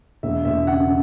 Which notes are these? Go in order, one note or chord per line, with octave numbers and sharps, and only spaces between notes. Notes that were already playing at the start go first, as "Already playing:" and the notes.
E1 E5
E1 E5
C#3 F#5